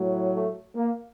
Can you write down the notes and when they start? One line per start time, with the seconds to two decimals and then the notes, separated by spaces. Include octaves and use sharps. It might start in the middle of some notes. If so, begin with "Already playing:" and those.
Already playing: A2 F#3
0.33 A3
0.75 A#3